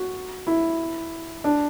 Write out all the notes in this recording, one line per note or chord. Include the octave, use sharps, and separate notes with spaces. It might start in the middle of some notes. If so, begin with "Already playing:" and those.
Already playing: F#4
E4
D4